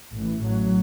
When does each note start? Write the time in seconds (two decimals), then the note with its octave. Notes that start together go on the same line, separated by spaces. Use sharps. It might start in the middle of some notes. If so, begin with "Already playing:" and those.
0.14 A1 A2 E3
0.42 A1 A2 F#3